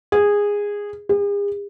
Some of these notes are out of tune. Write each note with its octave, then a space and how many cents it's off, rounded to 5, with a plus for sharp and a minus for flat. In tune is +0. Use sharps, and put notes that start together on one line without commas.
G#4 -15
G#4 -45